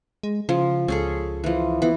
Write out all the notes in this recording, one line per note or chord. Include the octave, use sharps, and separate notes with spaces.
G#3
C#3 F3
C#2 C#4 G#4 A4
E3 F3
E3 B3